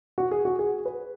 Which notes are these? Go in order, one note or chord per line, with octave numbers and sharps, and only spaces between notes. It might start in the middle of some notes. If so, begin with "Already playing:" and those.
F#4
G#4
F#4
G#4
B4